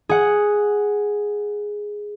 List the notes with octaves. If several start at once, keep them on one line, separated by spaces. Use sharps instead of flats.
G#4 F#5